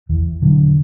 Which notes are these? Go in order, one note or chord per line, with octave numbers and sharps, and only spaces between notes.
E2 E3
B2 D3 F#3